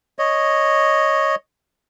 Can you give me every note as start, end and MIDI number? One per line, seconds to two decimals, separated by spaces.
0.19 1.35 73
0.19 1.35 75